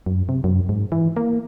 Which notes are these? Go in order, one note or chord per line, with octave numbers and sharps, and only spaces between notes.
F#2
C3
F#2
G#2
E3
A#3